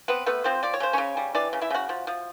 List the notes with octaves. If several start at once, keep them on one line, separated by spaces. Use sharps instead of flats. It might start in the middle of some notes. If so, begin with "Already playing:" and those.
B3 C4 B4
A3 B3 B4
F3 C4 C5
F3 D5
C#5
C#3 C5
C#3 C#4 C#5
G3
E3 D4 D5
C#3
E4 E5
C#3 F#4 F#5
F3
F3